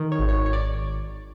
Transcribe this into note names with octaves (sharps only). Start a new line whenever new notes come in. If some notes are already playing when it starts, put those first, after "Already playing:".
Already playing: D#3
C#5
G#1
C#5
G#1 C#5
D5